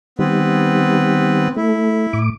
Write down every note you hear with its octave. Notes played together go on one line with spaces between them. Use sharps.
D#3 G3 B3 C4 B4
A3 E4
A2 D6